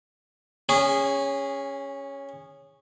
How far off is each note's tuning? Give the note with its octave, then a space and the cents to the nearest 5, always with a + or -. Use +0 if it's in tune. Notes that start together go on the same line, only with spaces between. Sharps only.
C#4 +0 G#4 -25